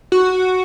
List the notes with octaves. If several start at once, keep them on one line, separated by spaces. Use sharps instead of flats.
F#4